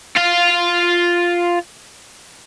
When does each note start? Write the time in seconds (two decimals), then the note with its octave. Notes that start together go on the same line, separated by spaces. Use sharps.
0.16 F4 F5